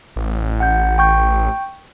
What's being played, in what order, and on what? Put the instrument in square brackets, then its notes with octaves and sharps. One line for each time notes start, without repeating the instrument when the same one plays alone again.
[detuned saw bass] A1
[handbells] F#5 G6
G5 C#6 G6